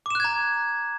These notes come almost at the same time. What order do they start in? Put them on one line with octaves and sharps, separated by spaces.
D6 E7 F#6 G#6 A#5